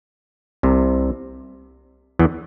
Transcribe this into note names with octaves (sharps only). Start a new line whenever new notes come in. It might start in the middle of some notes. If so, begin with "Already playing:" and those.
C2 C3
E2 E3